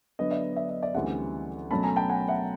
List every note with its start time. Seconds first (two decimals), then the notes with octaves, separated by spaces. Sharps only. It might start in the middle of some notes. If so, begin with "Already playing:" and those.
0.19 D3 F#3 B3 D#5
0.31 D5 E5
0.56 D5 E5
0.69 D#5
0.82 D5 E5
0.94 D2 C#3 E3 G3 C4 E5 F#5
1.70 B2 F#3 A3 C#4 A5 B5
1.84 G#5 A#5
1.96 G5 A5
2.09 F#5 G#5
2.28 E5 F#5